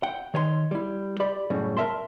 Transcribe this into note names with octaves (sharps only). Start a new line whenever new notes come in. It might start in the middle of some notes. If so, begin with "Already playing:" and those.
F#5 G5
D#3 C#5 G#5 C6
G3 E4
G4 D5 B5
F#2 A2 C#3 G3
A#4 C5 E5 A5 C6